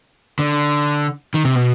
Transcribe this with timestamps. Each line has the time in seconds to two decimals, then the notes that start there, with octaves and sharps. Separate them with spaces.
0.39 D3
1.34 D#3
1.45 C3
1.55 B2